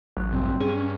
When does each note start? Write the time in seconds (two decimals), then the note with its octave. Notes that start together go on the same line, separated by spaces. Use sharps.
0.17 A1 F#3 F#6
0.32 C#2 G2 B2 C4
0.60 G2 C#4 G#4